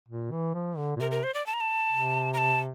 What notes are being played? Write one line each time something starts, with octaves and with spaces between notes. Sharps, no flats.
A#2
E3
F3
D3
A#2
C3 A#4
A#4
C5
D5
A5
A#5
A5
C3
A#5
A5